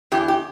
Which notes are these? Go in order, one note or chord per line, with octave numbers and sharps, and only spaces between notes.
E2 G4
G4